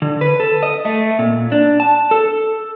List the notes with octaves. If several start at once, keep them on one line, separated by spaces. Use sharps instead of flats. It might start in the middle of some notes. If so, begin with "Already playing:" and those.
D3
B4
A4
D#5
A3
A#2
D4
A5
A4